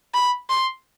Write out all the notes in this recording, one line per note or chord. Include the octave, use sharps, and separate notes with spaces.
B5
C6